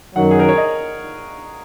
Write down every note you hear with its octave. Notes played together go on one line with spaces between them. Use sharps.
F#2 D#3 F#3 F#5
G#4
A#4
C#5
D#5